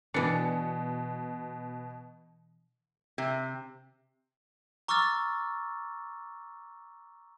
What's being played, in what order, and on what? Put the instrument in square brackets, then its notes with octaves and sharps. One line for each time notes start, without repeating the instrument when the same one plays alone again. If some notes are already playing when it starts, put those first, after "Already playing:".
[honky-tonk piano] B2 C#7 [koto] E3 D4
[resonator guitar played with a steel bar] C3
[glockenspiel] A#5 C#6 D6 E6 F6 A6